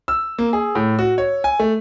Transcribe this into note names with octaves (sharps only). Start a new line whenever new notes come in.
E6
A#3
G#4
A2
F#4
C#5
G#5
A3